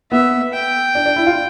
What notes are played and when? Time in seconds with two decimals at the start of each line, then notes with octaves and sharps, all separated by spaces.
0.12 B3 E5
0.53 G5
0.95 D4
1.06 D4
1.16 E4
1.27 F4